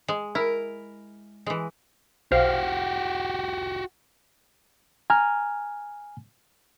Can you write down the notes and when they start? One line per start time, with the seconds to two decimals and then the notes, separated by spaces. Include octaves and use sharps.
0.08 G#3
0.35 E4 A#4
1.46 E3 G#3
2.32 B1 F#4 G4 C5 F5
5.10 G#5 A#5 F6